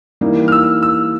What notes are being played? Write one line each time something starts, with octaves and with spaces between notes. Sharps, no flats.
E3 G3 A#3 D#4
F6
E6
E6